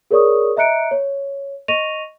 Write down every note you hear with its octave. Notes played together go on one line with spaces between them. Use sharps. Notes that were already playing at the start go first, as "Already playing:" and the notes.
G#4 A#4 C#5 D5 C#6 D#6
D#5 E5 A#5 F#6 C#7 D7
C#5
D#5 C#6 A#6 D#7 F7